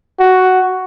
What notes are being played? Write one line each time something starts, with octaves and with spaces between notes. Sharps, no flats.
F#4